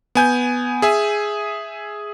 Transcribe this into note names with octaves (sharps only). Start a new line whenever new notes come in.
B3 G#5 G6
G#4 E5 G#5